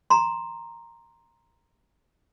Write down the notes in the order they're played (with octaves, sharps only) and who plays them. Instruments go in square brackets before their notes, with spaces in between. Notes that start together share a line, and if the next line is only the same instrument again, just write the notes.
[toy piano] A#5 C6